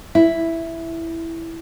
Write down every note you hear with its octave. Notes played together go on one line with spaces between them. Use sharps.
E4